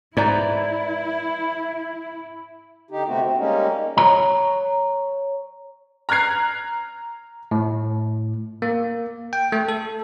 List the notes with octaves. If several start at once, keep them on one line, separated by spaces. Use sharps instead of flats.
G#2 E4 B4 D5 A#5
D3 D#4 G4
C3 A3 B3 C4 F#4
C4
G3 G#3 A#3 C#4 D#4
C#5 A#5
A#5 F6 F#6 G#6 C7
A2
A#3
G5
A3
A4